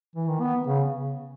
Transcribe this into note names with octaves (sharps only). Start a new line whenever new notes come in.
E3
D#3
B3
C#3